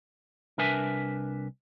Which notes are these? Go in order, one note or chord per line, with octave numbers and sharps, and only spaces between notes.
C2 D4 A#4 B4 E5 G#5